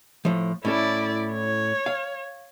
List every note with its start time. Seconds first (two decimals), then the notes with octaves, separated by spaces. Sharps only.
0.25 A2 F3
0.65 A2 C#4 E4 A4 D5
1.33 C#5
1.86 F5